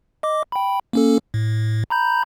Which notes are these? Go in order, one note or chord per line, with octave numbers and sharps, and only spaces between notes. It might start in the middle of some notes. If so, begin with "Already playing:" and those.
D#5 D6
G5 B5
A#3 C#4 A4
A2
A#5 B5 G6